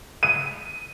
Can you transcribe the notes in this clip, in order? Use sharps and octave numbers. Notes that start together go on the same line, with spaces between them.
D#7